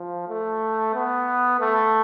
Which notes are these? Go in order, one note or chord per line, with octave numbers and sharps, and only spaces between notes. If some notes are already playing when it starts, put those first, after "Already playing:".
Already playing: F3
A3
B3
A3